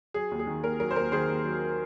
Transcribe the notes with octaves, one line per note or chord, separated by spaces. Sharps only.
F#3 G#4
D#2
G#4
D#3
D#2 A#4
F#3 A#4
C5
D#2 A#4
D#3 G#4 C5
D#2
F#3